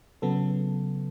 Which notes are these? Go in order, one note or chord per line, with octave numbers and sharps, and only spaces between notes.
C#3 F#3 B3 A4